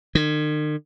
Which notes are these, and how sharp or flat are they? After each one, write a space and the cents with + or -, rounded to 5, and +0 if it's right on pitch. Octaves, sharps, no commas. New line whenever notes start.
D#3 -45